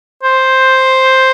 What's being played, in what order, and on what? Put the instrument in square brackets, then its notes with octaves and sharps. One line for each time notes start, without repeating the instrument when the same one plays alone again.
[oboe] C5